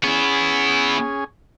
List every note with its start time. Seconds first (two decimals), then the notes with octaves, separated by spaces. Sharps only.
0.04 B3 C#4 E4 G#4